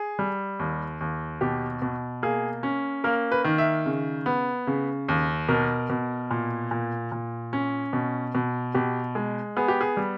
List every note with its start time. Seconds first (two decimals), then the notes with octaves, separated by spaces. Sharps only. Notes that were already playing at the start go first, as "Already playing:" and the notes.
Already playing: G#4
0.19 G3
0.59 D#2
1.01 D#2
1.41 B2 G4
1.82 B2
2.22 A#3 G#4
2.63 C#4
3.04 A#3 A#4
3.32 B4
3.44 D#3
3.58 E5
3.86 C#3
4.26 B3
4.67 C#3
5.08 D#2
5.49 B2 A#4
5.90 B2
6.31 A#2
6.71 A#2
7.12 A#2
7.53 C#4
7.93 B2
8.35 B2
8.74 B2 G4
9.15 G#3
9.56 B3 G#4
9.68 G4
9.81 G#4
9.97 G3